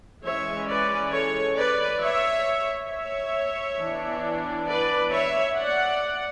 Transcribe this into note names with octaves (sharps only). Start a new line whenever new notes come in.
E3 G#3 C#4 C#5 E5
B4 D5
A4 C#5
B4 D5
C#5 E5
C#5 E5
E3 B3 D4
B4 D5
C#5 E5
D5 F#5